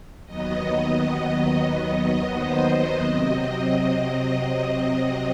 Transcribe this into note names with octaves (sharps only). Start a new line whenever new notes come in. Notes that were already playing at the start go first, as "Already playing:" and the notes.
D#2 D#3 F#3 B3 D#5
D#5
D#5
C5
C3 F#3 C4 D#5